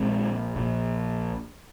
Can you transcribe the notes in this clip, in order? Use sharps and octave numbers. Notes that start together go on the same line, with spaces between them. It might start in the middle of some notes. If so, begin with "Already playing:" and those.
Already playing: A#1 A#2 G#3 C4
A#1 A#2